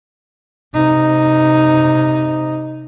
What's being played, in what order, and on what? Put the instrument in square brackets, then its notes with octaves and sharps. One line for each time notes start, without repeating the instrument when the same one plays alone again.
[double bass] C3 D#4